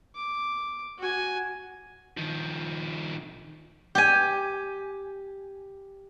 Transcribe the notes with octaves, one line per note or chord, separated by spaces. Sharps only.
D6
F#4 G#5
D#3 F3
G4 G#5